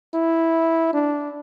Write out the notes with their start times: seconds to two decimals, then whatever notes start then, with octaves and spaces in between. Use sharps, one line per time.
0.14 E4
0.94 D4